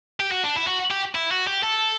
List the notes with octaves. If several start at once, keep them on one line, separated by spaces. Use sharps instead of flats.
G4
F#4
D4
E4
F#4
G4
E4
F#4
G4
A4